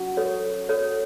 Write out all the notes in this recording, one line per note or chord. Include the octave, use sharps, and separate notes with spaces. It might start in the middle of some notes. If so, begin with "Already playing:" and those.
Already playing: F#3 C#4 F#4
A4 C#5
A4 C#5